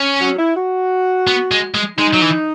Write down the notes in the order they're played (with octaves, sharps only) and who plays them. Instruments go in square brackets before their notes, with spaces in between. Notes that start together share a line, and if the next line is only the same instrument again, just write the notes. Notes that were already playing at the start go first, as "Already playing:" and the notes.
Already playing: [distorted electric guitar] C#4
[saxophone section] F#3
E4
F#4
[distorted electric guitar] B3
G#3
G#3
[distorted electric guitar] G#3 [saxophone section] D#4
[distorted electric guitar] F#3
E3